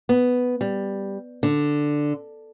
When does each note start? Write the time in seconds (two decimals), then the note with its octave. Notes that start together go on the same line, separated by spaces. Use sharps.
0.09 B3
0.61 G3
1.43 D3